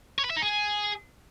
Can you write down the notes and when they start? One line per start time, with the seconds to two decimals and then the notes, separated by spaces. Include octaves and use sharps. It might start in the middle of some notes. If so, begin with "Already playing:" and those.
0.18 C#5
0.24 B4
0.30 E5
0.36 D#4
0.42 G#4